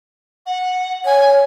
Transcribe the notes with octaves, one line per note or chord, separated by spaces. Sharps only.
F#5
C#5 G#5